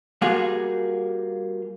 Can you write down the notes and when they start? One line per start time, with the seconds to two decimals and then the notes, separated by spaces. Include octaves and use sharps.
0.22 G3 A#3 F4 F#4 G#4